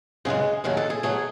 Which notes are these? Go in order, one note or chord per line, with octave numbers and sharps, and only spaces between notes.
F#2 C#3 E3 G#3 G#4
D#2 D#3 F#3 A3 G#4
A4
G#4
B2 F#3 A3 G#4